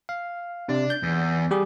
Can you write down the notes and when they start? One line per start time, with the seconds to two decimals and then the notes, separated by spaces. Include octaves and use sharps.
0.09 F5
0.69 C3 D4
0.90 G6
1.03 E2
1.51 G3 G4 G#4